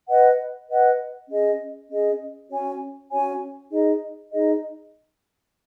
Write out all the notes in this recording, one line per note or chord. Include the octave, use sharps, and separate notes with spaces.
B4 D#5 F#5
B4 D#5 F#5
C#4 G#4 D#5
C#4 G#4 D#5
C#4 F#4 C#5 G#5
C#4 F#4 C#5 G#5
D#4 G#4 D#5
D#4 G#4 D#5